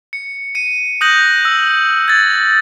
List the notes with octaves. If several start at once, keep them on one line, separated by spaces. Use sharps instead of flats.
C#7
C#7 D#7
D#6 F#6 G6 A#6 F#7
E6
G#6 A6